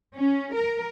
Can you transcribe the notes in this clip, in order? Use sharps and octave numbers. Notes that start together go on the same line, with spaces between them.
C#4
A#4